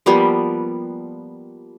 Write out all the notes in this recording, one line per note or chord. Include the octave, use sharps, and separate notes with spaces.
F3 G3 A#3 B3